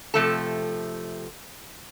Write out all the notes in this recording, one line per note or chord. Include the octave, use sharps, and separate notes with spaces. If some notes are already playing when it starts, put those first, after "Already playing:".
C3 F3 A3 A4